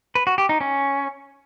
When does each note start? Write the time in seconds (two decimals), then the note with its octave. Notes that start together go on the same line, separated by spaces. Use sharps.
0.15 B4
0.27 F#4
0.38 G4
0.49 D#4
0.61 C#4